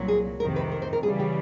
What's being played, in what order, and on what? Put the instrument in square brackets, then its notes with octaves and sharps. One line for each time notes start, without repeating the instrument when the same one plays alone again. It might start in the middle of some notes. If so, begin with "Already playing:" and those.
Already playing: [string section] C2 A#2 F#3
[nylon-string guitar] G#4
[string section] F2 C3 D#3 [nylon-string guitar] A#4
[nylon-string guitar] B4
A#4
C5
A#4
[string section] C#3 E3 G3 [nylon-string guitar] G#4
[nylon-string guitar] G4